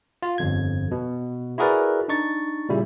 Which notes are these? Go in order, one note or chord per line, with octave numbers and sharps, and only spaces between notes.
F4
G1 F2 G#6
B2
E4 F#4 G#4 A#4 B4 D5
D4 D#4 C#6 A6
A#2 C#3 G3 E4